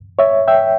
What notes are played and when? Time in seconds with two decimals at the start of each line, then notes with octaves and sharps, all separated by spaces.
0.19 C#5 E5
0.48 E5 G5